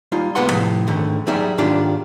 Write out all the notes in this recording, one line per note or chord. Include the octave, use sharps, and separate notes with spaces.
G3 D#4 F4
C2 G#3 A#3 B3 F#5 C6
A2 C3 F3
G#2 D3 D#3 A3
F#3 G3 D#4 G#4 E5
G#2 D#3 D4 F4 G4